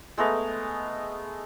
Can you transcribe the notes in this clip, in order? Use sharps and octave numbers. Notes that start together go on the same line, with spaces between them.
G#3 A3 B3 A#5